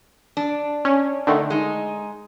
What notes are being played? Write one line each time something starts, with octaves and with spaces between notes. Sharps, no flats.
D4
C#4
D3 D#3 A3
G#3 D#4